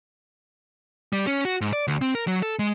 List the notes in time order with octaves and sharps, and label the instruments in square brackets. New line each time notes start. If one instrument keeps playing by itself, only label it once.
[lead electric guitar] G3
C#4
F#4
G#2
D5
D2
C4
A#4
F#3
A4
G#3